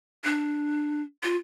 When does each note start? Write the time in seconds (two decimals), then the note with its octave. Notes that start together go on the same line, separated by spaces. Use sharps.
0.24 D4
1.23 F4